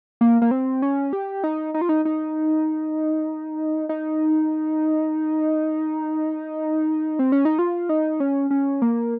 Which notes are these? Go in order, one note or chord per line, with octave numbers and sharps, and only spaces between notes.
A#3
A#3
C4
C#4
G4
D#4
D#4
F4
D#4
D#4
D#4
C4
C#4
D#4
F4
D#4
C#4
C#4
A#3